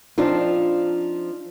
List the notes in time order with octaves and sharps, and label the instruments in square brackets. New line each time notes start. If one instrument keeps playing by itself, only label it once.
[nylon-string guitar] F3 C4 D4 D#4 F4